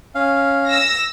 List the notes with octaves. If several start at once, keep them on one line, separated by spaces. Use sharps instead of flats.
C#4 F5
E6 A#6